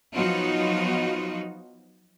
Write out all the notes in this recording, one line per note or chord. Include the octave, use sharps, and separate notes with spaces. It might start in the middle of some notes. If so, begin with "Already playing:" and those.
F3 F#3 B3 D#4 F4 F#4